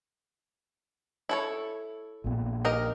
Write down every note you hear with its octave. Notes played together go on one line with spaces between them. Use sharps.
E4 A4 C#5
A#1 A#2 B3
G4 A#4 D#5